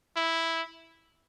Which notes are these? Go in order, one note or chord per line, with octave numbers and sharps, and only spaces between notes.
E4